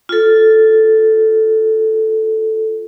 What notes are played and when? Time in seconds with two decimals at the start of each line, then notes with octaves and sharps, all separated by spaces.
0.09 F4 A4